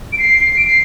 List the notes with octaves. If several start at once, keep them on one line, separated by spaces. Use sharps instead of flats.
D7
C7
D7
C7